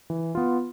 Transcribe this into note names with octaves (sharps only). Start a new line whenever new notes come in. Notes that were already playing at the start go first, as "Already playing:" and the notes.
E3
B3 F4